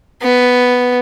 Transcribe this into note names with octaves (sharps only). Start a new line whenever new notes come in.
B3